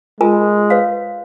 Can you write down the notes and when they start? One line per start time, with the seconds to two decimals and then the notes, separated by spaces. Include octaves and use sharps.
0.21 G#3 F4 A#4 G#5
0.70 B4 C#5 F5